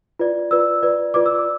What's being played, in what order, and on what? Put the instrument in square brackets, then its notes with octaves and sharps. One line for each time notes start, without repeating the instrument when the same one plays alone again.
[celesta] F4 B4 D5
F4 B4 D5 E6
F4 B4 D5
F4 B4 D5 D6
E6
D6